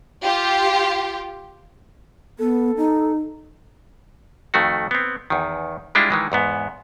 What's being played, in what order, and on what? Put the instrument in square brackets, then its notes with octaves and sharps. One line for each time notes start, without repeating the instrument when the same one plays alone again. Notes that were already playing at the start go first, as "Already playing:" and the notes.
[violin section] F4 G4
[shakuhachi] B3 [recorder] A4
[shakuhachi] D#4
[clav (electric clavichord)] F2 D#3 A3 F#4
B3 C4
E2 D#3
G3 G#3 D4 E4 F4 G5
D#3 E3 G#3
E2 G#2 B3